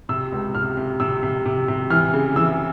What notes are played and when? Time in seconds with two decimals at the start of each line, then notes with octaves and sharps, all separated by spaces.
0.09 C3 E6
0.32 C#2
0.55 C3 F6
0.77 C3
1.00 C3 E6
1.23 C3
1.46 C3
1.68 C3
1.90 E3 F6
2.13 C#3
2.36 E3 E6